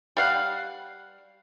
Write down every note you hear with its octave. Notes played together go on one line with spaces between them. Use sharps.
G3 F5 F#5